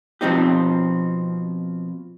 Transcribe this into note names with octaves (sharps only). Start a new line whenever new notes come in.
B2 F3 C4 D#4 G4